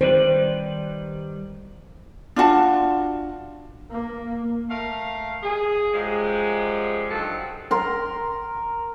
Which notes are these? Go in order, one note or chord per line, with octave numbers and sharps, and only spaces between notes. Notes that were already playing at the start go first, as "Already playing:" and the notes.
D#3 G3 B4 C5
D4 F4 F#4 A5
A#3
A3 A#4 F5
G#4
F#2 F3 G3 G#3
G2 D#3 F3 F#3 A4
A#4 C6